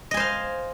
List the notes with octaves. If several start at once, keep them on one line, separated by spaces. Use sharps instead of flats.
C5 D#5 F5 G#5